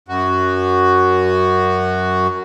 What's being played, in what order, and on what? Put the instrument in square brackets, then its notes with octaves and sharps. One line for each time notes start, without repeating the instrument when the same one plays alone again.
[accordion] F#2 F#4